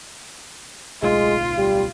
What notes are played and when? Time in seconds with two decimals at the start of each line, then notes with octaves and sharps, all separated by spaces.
1.02 D1 B1 G#3 F4
1.58 G3